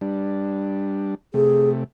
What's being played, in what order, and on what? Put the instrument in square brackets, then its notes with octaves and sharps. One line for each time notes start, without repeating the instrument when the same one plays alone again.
[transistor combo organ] G3 D4
[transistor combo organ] C3 A3 [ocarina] G#4